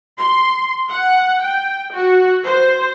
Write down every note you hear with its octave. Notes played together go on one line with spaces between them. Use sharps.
C6
F#5
G5
F#4
C5